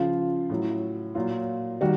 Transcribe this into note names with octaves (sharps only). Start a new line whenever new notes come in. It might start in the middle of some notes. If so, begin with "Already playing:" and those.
Already playing: C#3 F3 F4
A2 F#3
A#2 F#3 F4
D#3 G3 F#4